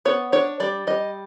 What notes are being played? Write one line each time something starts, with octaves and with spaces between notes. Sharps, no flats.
B3 C#5
D4 C#5
G3 D5
G3 D#5